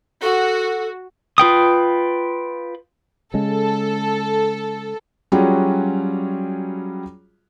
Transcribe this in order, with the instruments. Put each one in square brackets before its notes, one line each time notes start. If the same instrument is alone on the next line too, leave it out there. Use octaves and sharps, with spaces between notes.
[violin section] F#4 [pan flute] A4
[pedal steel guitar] F4 B4 G5 D#6
[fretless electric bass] C#3 G#3 [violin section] A4
[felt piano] F#3 G3 C#4 F4 F#4 G#4